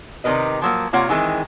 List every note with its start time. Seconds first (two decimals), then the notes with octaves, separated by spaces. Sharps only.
0.24 C3 D#3 A#4 B4 D#5
0.62 F3 F#3 A#3
0.93 C3 A#3 F4 C#5 F#5
1.09 D#3 E3 G#3 C4